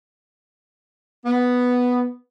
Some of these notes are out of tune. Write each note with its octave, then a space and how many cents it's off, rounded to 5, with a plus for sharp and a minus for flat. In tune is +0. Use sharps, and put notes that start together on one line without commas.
B3 +0